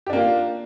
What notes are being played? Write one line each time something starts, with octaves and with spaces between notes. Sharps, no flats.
A#3 D4 F4 G4